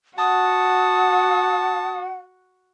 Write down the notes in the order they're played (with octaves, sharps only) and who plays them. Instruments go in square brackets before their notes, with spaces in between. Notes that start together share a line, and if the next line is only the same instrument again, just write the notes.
[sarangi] F#4 [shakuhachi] F#5 [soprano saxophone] A5 [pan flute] D#6